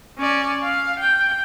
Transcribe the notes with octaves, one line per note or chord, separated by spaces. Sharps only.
C#4 D5
F5
G5